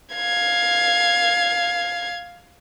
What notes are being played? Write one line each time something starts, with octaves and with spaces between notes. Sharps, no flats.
F5 G#6